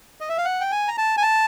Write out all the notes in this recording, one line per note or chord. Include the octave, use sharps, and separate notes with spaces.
D#5
E5
F5
F#5
G5
G#5
A#5
A5
G#5
A5